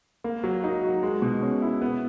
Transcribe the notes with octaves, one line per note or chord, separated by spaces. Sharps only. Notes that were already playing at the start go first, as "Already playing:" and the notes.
A#3
F#3
D#4
F#4
G#3
B2
C#4
E4
B3